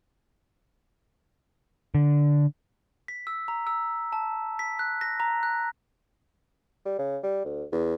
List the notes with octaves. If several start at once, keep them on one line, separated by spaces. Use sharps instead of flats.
D3
B6
E6
A#5
E6
A5
B6
F#6
A#6
A#5
F#6
G3
C#3
G3
D2
E2